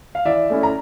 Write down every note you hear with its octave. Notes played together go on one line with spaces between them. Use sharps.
F5
E3 D5 E5
A3 C#4 E4
A#5